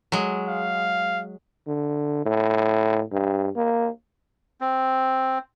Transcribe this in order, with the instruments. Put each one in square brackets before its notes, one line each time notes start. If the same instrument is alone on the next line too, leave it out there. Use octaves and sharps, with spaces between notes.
[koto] F#3 G#3
[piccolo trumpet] F5
[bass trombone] D3
A2
G2
A#3
[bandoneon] C4